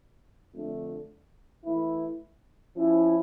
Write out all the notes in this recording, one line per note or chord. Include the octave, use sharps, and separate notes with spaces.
F2 D3 A3 D4
E3 A3 E4
F3 C#4 E4